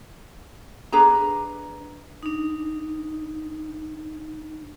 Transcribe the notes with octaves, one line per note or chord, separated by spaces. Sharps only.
D4 G#4 B4 A#5
D4 D#4